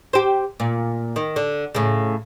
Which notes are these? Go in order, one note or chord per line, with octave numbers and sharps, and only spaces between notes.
G4 C5
A#2
D#3
D3
A2 C#3